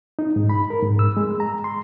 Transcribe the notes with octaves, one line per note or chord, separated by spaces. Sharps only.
D#4
G#2
B5
A#4
G#2
E6
G#3
A#5
C6